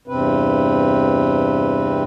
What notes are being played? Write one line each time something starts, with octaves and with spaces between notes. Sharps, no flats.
E2 G2 C3 C4 B4